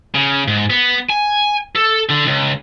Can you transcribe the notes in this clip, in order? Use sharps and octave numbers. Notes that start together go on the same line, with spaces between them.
C#3
G#2
B3
G#5
A4
D3
C#2